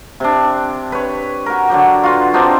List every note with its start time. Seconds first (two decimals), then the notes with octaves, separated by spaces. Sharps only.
0.20 C3 D4
0.92 B4 C#5
1.46 F#4 A#4
1.69 D3 F#3 G4
2.03 F4 F#4 B4
2.33 C4 D4 D#4 G4